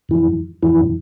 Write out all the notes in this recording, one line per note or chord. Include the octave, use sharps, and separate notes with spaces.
F2 E3
F2 E3